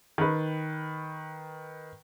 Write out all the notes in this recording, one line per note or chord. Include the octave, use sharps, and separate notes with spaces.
D#3 B4